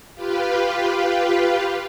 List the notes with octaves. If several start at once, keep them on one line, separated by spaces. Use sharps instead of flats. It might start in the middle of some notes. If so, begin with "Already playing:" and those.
F4 G4 B4 F5